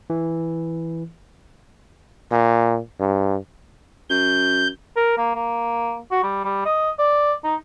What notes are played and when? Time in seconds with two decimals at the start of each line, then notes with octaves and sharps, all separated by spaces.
0.10 E3
2.31 A#2
3.00 G2
4.10 F#2 G6
4.96 A#4
5.18 A#3
5.35 A#3
6.11 F#4
6.23 G3
6.45 G3
6.66 D#5
6.99 D5
7.44 D#4